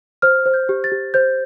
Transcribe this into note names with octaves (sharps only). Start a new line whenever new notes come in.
C5 F6
C5
G6
G4
A6
G4
C5 G6